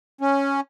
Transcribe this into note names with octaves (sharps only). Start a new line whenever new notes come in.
C#4